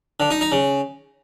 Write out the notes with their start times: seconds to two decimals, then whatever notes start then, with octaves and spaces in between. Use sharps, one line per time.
0.20 D3
0.30 D#4
0.41 D#4
0.52 C#3